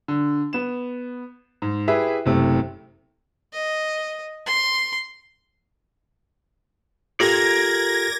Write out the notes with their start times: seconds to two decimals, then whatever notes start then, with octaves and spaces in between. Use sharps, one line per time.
0.08 D3
0.53 B3 E7
1.62 G#2
1.88 E4 G4 G#4 B4 E5
2.26 F#1 C3 A3
3.53 D#5
4.46 C6
7.20 F4 G4 A4 A#4 D5 G#6 A#6